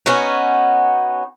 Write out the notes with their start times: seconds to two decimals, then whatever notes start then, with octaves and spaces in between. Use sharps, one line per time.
0.06 B3 C#4 D#4 F#4